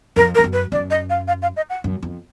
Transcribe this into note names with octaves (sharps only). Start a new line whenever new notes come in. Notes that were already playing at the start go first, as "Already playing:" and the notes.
F2 A#4
A#4
F2
F#2
B4
F#2 D5
D#5
F5
F5
F5
D#5
F#5
F#2
F2